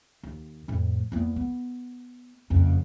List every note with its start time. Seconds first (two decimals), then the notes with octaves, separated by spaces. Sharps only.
0.23 D#2
0.68 F2 A2
1.12 E2 A#3
1.36 B3
2.50 F#1 F2